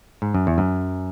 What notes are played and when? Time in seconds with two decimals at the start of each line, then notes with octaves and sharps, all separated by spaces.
0.22 G#2
0.35 F#2
0.47 E2
0.58 F#2